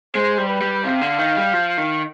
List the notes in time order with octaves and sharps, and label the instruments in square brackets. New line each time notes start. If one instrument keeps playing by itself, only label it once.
[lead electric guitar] G#3 [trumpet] C5
[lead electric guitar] G3
[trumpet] B4
[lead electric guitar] G3
[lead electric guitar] C3 [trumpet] F5
[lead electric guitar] D3
D#3
G3
F3
D#3